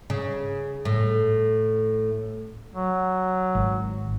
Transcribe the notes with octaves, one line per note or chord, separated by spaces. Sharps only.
C#3
A2
F#3
G#1